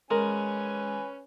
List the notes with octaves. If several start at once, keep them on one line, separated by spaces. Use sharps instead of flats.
G#3 C#4 A#4 B4 G#5